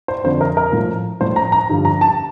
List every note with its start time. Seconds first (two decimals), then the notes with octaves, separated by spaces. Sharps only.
0.08 C5
0.24 F2 D3 F3 C5
0.41 A#4
0.57 A#4
0.72 A2 F3
1.20 A2 F3 C5
1.36 A#5
1.52 A#5
1.69 G2 D3 F3
1.85 A#5
2.01 A5